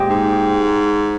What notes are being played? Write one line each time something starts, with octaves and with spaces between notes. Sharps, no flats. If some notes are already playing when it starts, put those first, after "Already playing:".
Already playing: A#2 G#3 C4 G4
G#2